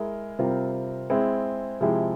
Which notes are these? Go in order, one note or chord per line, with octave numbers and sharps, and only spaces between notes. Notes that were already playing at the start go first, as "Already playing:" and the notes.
Already playing: G#3 E4 A#4
C3 G3 C4 F4 A#4
G#3 C4 E4
C3 F3 G#3 E4 G4